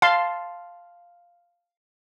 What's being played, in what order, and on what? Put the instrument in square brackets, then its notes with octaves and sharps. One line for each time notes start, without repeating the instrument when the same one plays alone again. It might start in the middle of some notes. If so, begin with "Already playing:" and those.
[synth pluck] F5 [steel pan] A5 C6